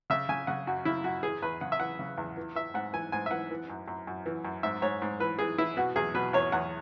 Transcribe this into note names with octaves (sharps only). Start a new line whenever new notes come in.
C#3 E5
C#3 G#5
C#3 F#5
F#2 F#4
C#3 E4
F#2 F#4
E3 G#4
E2 B4
C#3 F#5
E5
E3 F#5
C#3
E2
E3
E3 E5
G#2 F#5
E3 G#5
G#2 G#5
E5
E3 F#5
E3
F#2
F#2
F#2
E3
F#2
G#2 E5
G#2 C#5
G#2
E3 B4
E3 G#4
E3 E4
B2 F#4
E2 G#4
B2 B4
E2 C#5
E2 F#5